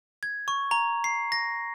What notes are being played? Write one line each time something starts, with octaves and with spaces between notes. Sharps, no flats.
G#6
C#6
A#5
C7
A#6